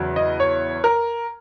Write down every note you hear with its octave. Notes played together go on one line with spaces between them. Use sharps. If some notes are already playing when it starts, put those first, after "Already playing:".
Already playing: E2 C#3 F#3
D#5
C#5
A#4